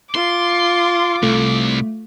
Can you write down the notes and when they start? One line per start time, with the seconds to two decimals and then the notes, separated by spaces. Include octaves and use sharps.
0.15 F4 C6 D6
1.23 C2 A3